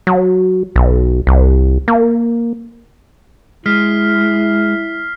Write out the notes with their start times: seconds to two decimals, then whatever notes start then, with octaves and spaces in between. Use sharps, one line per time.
0.07 F#3
0.76 B1
1.27 C2
1.88 A#3
3.66 G#3 E4 F6 B6 C7